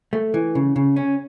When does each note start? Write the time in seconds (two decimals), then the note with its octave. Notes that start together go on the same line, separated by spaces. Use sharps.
0.13 A3
0.34 E3
0.55 C#3
0.76 C#3
0.96 C#4